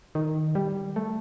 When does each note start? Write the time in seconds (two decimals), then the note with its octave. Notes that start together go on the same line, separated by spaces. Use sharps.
0.15 D#3
0.55 G3
0.96 A3